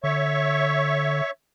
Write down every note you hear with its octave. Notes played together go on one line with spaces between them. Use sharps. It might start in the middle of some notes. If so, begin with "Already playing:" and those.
D3 C#5 E5 C#6